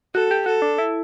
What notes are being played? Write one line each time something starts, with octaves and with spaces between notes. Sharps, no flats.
F#4 A4
G4
F#4 A4
D4
E4